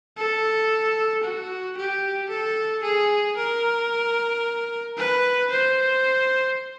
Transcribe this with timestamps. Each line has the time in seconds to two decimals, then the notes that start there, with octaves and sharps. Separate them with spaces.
0.17 A4
1.23 F#4
1.77 G4
2.30 A4
2.84 G#4
3.37 A#4
4.97 B4
5.50 C5